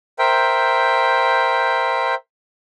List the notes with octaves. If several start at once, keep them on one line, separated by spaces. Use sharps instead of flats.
A#4 C5 E5 G5